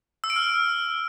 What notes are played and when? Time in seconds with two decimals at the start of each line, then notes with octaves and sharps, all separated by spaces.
0.24 E6
0.30 D7
0.36 F6